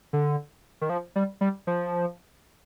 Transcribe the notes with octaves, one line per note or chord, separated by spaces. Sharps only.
D3
D#3
F3
G3
G3
F3